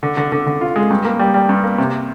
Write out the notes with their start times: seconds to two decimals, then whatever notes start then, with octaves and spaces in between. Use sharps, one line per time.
0.03 D3
0.17 D3
0.32 D3
0.47 D3
0.61 F4
0.76 G#3
0.90 G2
1.05 A#3
1.20 G3
1.34 G3
1.49 G2
1.64 A#3
1.78 C3